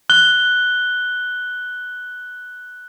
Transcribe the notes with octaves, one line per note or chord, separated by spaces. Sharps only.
F#6 G7